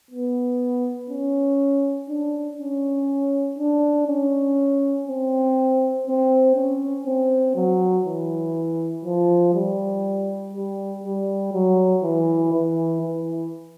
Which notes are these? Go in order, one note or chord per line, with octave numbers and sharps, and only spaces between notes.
B3
C#4
D4
C#4
D4
C#4
C4
C4
C#4
C4
F#3
E3
F3
G3
G3
G3
F#3
E3
E3
E3